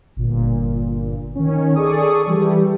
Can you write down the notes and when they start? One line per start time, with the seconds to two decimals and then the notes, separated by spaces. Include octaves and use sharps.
0.16 G1 A#2
1.35 D#3 C#4
1.75 G#4 A4 D5 C#6 D#6
2.27 E3 G3 G4